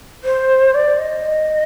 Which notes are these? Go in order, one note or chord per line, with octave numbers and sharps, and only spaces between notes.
C5
D5
D#5